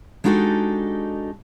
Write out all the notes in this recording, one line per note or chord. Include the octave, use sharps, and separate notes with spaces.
G#3 D4 D#4 F#4 G4 A4